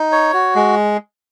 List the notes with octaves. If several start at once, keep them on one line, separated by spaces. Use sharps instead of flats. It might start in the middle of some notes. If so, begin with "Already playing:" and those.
Already playing: D#4
C#5
F#4
G#3